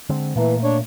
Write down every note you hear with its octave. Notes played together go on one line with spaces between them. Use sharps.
D3 G#3 C4
A#2 E3 A3 A#3
D4 C#5